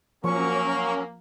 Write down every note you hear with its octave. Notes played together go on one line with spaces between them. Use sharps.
F3 F#3 A#3 C#4 C#6